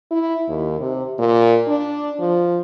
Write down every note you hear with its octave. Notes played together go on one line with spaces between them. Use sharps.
E4
D#2
C3
A#2
D4
F3